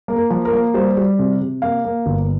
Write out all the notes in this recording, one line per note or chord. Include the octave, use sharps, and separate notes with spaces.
A#3
A#4
F3
A#4
A#3
G3 C5
G3
C3
C3
A#3 F5
A#3
G1